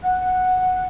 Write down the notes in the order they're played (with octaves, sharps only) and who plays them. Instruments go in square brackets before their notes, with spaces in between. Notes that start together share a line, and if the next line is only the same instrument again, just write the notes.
[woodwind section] F#5